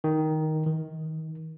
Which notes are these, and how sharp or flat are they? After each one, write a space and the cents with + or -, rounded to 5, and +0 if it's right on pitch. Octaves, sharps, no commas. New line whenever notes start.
D#3 +5
D#3 +30